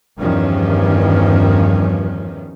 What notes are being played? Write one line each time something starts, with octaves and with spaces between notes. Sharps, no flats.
E2 G2 D#3 F3 C#4